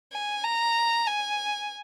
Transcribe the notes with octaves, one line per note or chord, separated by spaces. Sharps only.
G#5
A#5
G#5